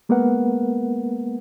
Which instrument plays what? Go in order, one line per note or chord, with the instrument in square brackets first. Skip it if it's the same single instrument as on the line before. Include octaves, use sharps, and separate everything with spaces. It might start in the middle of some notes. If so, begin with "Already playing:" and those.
[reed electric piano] G#3 A#3 B3 A#4 B4 F#5